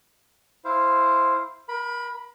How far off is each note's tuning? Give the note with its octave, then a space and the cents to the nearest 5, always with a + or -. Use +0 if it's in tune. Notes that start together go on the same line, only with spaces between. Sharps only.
E4 +0 C5 +0 F5 -15
A#4 +35 B5 +0